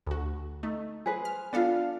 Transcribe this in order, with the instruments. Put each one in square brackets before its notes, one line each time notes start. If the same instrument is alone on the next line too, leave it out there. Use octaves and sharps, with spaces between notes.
[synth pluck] D2 F#4
A3 D#4
[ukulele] G#4 B4 C5
[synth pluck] F6
[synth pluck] B3 A4 F5 [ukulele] D4 F4